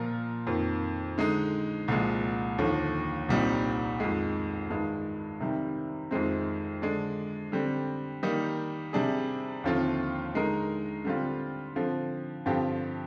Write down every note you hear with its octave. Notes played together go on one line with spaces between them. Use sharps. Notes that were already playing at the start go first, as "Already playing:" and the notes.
Already playing: A#2 F3 A#3 F4 A#4
F2 D#3 A#3
D3 G#3 D#4
C2 A#2 F3 G#3
D#2 D3 F3
C2 A#2 G3 C4 D#4
F2 D#3 G#3
G2 D#3 G#3
C3 D#3 G3
F2 D#3 G#3 C4
D3 G#3 D4
D3 G3 C4
D#3 G3 A#3 D#4
C3 G3 D4 G#4
D#2 D3 F3 C4 F4
D3 G#3 D#4 A#4
D3 G3 C4 F4
D3 F3 C4
G2 D3 F3 C4 G4